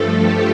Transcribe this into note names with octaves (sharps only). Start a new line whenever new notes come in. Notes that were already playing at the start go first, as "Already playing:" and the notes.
Already playing: G2 F3 A3 A4
G4